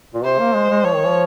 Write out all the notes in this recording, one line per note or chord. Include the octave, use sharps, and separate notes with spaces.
A#2
C3 C5
A#3
G#3
G#3
F3 C#5
D#3
F3